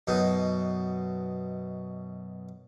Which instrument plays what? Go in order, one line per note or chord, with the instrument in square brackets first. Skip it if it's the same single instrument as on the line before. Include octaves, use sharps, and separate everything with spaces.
[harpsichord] F#2 B2 D#4